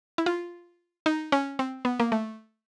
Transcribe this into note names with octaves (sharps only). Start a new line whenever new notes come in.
E4
F4
D#4
C#4
C4
B3
A#3
A3